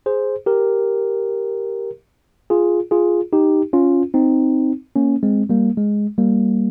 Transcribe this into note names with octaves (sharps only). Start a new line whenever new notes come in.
G#4 C5
G4 A#4
F4 G#4
F4 G#4
D#4 G4
C#4 F4
C4 D#4
A#3 C#4
G#3 C4
G3 A#3
G#3
G3 A#3